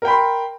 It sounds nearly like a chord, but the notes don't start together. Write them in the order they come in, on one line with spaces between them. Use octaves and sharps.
A#4 G5 B5 C6